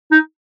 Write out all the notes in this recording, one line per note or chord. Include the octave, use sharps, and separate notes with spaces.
D#4